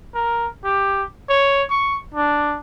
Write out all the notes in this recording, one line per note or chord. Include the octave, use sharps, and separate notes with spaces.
A#4
G4
C#5
C#6
D4